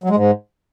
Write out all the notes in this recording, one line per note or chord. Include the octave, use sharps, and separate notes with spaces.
F#3
G#3
G#2